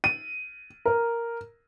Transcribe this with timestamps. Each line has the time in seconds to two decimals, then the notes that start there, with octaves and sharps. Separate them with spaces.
0.04 D#7
0.85 A#4